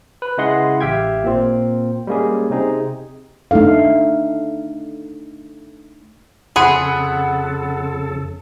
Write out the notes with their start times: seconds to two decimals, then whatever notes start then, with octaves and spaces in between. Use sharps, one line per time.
0.22 B4
0.38 C#3 G#3 E4 D#5 F#5 C6
0.81 A1 G4 E5 F5 G5 G#6
1.24 A#2 A#3 C4 F4
2.07 G3 G#3 A#3 C#4 G#4
2.50 C3 C4 D#4 G#4
3.51 A3 D4 D#4 A4 F5
6.56 F2 C#3 G#4 A4 F#5 B5 C6